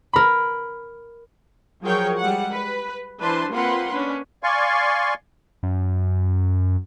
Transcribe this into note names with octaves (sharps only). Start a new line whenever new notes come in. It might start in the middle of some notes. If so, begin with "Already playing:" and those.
A#4 B5
F3 F#3 G#4 A#4 C#5 G5
G3 G#3 F#5
B4
E3 D4 B4 C5 A5 C6
A#3 C4 F4 B4 F#5 C6
C#4 D4 B4
D5 F5 G#5 C6 C#6
F#2